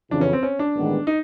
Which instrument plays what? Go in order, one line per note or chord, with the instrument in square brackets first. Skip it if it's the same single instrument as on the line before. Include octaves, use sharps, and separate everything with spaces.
[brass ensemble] F2 C#3 E3 [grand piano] D4
[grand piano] C#4
C4
C#4
D4
[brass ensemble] A1 G2 D#3 G#3 B3
[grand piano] D#4